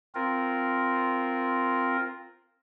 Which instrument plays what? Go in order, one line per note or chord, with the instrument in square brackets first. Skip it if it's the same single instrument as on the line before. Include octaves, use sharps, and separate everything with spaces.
[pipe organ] C4 F4 A#4